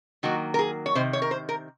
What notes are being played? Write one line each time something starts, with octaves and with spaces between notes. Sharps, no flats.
D#3 F#3 A#3 F#4
A#4
G#4
C#5
C3 D#3 C5
C#5
A#4
C5
A#4